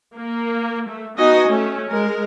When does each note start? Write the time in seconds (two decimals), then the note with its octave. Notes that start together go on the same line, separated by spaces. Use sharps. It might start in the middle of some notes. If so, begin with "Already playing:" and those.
0.17 A#3
0.89 A3
1.18 B3 D#4 F#4 D#5 G#5
1.49 A3 C#4
1.91 G#3 A#4